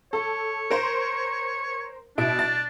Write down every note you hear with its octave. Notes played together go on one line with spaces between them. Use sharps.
A4 C#5
A#4 C5
B2 D4 E4 D7
A6